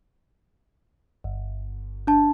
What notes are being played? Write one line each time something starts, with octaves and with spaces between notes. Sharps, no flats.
G1
D4 A5